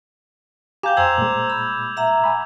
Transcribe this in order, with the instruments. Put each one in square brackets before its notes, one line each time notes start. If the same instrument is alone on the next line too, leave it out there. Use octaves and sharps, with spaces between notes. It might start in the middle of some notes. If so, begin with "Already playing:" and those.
[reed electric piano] G4 G#5 A#5 [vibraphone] F5 G5 [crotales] D6 G6
[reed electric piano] F2 G#5 [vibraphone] C5 A#5 C6 [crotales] E6 G#6 F7
[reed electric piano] A#2 G#3
[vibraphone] B5
E5 F#5 A#5
[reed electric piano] G#5 B5